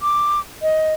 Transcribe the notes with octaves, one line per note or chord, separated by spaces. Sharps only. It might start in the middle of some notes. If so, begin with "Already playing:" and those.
D6
D#5